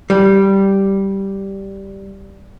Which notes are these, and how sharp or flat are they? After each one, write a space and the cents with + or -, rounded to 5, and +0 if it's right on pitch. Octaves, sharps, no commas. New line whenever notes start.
G3 -5